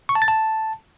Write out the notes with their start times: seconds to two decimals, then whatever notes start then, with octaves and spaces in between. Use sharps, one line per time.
0.09 C#6
0.15 A5
0.22 A6
0.28 A5